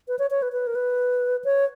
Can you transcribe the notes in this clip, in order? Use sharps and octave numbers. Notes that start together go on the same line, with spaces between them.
B4
C#5
C#5
B4
B4
A#4
B4
C#5